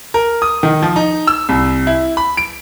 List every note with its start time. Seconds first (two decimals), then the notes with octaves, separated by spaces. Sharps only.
0.14 A#4
0.42 D#6
0.63 D#3
0.83 F3
0.96 D#4
1.27 E6
1.49 C2
1.87 E4
2.17 B5
2.37 D7